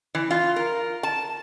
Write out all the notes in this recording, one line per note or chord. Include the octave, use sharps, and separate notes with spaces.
E3
F4
A#4
A5